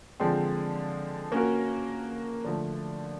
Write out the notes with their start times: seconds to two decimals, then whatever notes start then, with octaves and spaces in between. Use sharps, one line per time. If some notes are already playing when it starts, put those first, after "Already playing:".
0.20 D3 F3 G#3 C4
1.32 A#3 C#4 F#4 A#4
2.44 D3 F3 A3